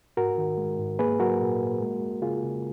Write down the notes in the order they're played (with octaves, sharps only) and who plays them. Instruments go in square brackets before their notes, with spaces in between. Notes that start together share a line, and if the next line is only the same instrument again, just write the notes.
[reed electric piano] G#2 F#4 A#4
D#3
G#3
G#2
A#3 G#4 B4
F#3 F#4 A#4
A#2
A#3
G#3
G#3
C#3 F4 G#4
C#3